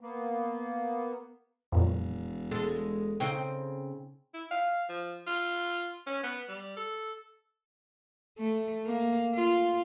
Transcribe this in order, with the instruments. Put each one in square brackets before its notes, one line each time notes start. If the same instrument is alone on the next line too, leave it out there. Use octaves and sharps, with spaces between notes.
[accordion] A#3 B3
[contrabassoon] E1 [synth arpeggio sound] F2 A#2 F#3
[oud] G#3 A4
[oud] C#3 C4 D#4 [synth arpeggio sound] G5 C#6 G6
[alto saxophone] E4
F5
F3
F4
C#4
B3
G3
A4
[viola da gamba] A3
A#3
F4